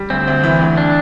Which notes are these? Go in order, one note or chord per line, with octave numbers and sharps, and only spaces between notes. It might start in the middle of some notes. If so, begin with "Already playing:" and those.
Already playing: G3
D2 C4
D2
E3
D2
D4